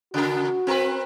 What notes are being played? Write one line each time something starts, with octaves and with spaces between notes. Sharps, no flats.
C#3 F#4 A#4
C4 A#4 B4